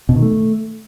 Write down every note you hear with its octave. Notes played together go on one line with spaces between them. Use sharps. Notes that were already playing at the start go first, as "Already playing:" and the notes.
B2
D#3
A3